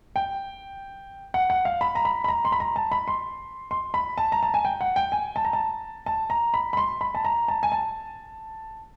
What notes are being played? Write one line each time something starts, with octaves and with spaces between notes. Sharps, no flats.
G5
F#5
F#5
F5
B5
A#5
B5
B5
A#5
C6
B5
A#5
A5
B5
C6
C6
B5
A5
A#5
A5
G#5
G5
F#5
G5
G#5
A5
A#5
A5
A5
A#5
B5
B5
C6
B5
A5
A#5
A5
G#5
A5